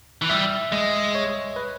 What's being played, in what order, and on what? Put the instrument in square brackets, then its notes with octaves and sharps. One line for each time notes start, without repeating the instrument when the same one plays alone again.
[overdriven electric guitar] E3
[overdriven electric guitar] G3 [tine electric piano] E5
[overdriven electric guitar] G#3 [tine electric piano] D#5
[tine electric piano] C#5
B4